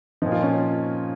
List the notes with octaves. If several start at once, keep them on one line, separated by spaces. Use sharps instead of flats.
A#2 F3 D#4
F4
C#4